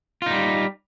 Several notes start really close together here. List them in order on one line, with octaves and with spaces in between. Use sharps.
F4 D#4 G3